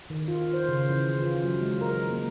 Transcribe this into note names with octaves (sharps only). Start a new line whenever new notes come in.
D#3
F4
C5
C#3
E3
F4
F#3
G#3
A#4
A#3